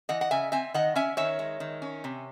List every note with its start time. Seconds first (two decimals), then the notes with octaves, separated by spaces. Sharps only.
0.09 E3 D#5 F#5
0.21 F#5
0.31 C#3 E5 G#5
0.52 C4 E5 G#5
0.74 D#3 D#5 F#5
0.96 C#4 E5 G#5
1.17 D#3 C#5 E5
1.39 G#3
1.60 D#3
1.82 C#4
2.04 C3